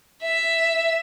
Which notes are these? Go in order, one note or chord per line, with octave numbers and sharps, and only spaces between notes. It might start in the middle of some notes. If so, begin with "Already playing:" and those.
E5